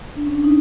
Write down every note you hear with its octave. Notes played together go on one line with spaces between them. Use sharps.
D4
C#4
D4
D#4